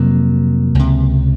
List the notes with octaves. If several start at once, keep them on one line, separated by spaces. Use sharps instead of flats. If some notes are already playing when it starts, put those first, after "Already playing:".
Already playing: F2 C3 F#3 A#3
C#2 C3